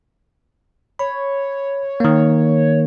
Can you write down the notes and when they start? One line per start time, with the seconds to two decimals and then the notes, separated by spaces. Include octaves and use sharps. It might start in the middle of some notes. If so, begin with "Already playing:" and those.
0.99 C#5 B5
2.00 D#3 A#3